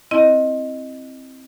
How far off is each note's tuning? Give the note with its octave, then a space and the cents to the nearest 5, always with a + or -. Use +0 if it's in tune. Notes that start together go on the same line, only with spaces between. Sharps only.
C4 +5 E4 +0 D#5 +0